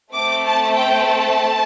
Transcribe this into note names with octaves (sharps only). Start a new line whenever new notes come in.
A3 C4 A4 D6
A5
G5
A5